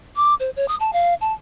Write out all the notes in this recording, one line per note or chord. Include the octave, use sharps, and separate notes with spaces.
D6
C5
C#5
D#6
A5
F5
A5